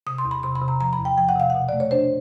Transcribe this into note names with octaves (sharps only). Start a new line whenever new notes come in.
C3 D#6
C6
E2
B5
C3 C6
B5
C3
A#5
F3 A#5
B5
E2
G5
F3 G5
F#5
C3 F5
B2 F#5
A3 D5
C#5
D4 C5